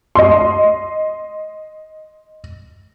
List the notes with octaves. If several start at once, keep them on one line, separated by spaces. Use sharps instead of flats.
D#5 C6